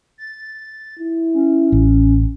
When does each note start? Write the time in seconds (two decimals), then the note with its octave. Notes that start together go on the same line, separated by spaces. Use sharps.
0.18 A6
0.99 E4
1.34 C#4
1.72 A1